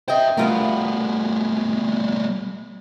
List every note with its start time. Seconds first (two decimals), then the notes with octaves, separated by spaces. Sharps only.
0.08 C5 D#5 E5 G5
0.37 G3 A3 B3 F4 A#4